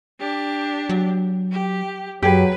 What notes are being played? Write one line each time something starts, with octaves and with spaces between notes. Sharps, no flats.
D4 G4
F#3
G4
F#2 F#3 G4 G#4 B4